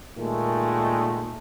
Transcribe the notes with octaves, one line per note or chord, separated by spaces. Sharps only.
A#2 D#3 G#3 A3